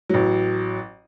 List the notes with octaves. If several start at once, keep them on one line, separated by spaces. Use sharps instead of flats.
A1 F#3